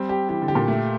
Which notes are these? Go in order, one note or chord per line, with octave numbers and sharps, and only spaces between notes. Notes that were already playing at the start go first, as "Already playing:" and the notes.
Already playing: G3 C4
G4
E3 G4
D3
G4
A#2
A3